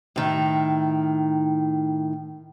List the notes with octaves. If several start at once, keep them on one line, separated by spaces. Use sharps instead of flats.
A2 D#3